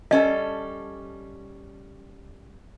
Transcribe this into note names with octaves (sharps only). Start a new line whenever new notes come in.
G3 C#4 A4 D#5